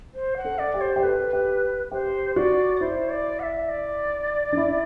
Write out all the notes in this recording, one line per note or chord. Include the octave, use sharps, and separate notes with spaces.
C5
F#5
A4
D5
G4
C5
G4
A4 B4
G4
G4 C5
F#4 D5
E4 C5
D5
F#5
E5
D5
D4
E4